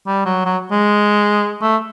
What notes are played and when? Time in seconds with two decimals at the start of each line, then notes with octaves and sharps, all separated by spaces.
0.07 G3
0.25 F#3
0.45 F#3
0.71 G#3
1.61 A3